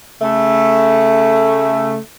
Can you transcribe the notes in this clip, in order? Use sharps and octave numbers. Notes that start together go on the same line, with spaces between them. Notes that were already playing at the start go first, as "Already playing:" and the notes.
C#3 A3